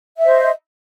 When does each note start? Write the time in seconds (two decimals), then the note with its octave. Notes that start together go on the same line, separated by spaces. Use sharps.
0.18 E5
0.22 D#5
0.26 C5